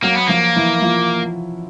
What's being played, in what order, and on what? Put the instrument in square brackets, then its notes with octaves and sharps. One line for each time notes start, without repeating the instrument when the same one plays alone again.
[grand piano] F#3 F#4 [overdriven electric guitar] A#3
[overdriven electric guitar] B3
[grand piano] F3 F4 [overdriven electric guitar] A#3
[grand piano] E3 E4
F3 F4